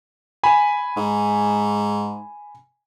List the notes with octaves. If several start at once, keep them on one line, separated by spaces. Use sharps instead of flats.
G#5 B5
G#2